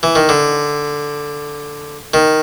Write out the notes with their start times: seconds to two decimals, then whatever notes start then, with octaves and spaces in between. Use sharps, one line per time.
0.03 E3
0.15 D#3
0.29 D3
2.14 D#3